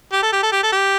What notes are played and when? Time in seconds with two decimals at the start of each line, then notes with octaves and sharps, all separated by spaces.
0.13 G4
0.22 A4
0.33 G4
0.43 A4
0.52 G4
0.63 A4
0.72 G4